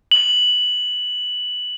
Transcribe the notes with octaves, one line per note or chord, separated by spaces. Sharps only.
F#7